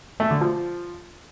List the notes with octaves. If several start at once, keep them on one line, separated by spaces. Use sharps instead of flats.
A3
D3
F3